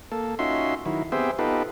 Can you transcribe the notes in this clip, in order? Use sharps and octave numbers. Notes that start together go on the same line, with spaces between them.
A#3 A4
C#4 D#4 F4 F#4 E5 C6
D#3 F#3 E4
B3 C4 G4 G#4 C5 E5
B3 D#4 F4 G4 A4 B4